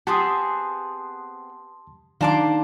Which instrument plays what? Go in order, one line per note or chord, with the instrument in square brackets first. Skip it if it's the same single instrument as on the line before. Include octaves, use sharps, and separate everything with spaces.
[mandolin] B3 C4 G#4 [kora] G4 [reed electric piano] A5 C6 D#6
[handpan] D#3 [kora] A#3 D4 [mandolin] C5 A5 D6